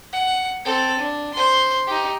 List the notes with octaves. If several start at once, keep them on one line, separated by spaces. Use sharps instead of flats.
F#5
C4 A4
D4
C5 C6
D#4 G4